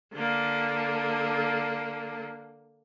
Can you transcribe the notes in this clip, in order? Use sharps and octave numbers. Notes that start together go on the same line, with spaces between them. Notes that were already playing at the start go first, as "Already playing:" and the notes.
D3 A#3